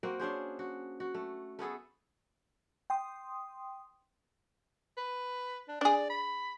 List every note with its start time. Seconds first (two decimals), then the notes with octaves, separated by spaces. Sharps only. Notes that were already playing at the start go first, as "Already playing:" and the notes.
0.03 A#3 C4 F#4
0.19 C#4 D4 G#4 C5
0.59 F#4
1.00 F#4
1.14 A3
1.59 A3 B3 G#4 A4
2.90 G5 C6 D#6
4.97 B4
5.68 D4
5.81 D4 G#4 D5
6.10 B5